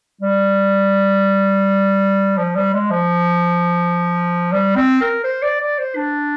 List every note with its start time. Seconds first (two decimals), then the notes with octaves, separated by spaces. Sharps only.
0.21 G3
2.37 F3
2.56 G3
2.73 G#3
2.91 F3
4.52 G3
4.76 C4
5.01 A#4
5.24 C5
5.43 D5
5.60 D5
5.79 C5
5.96 D4